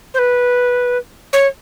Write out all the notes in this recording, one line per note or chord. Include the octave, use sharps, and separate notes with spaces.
C5
B4
C#5